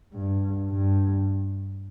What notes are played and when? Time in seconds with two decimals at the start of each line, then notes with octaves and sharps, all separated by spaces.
0.14 G2
0.71 G2